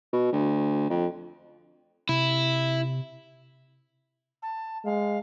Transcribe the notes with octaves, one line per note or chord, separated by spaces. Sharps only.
B2
D2
F2
C3 E4
A5
G#3 F5